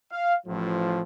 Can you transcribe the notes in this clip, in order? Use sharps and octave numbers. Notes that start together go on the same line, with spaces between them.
F5
A1 A2 F3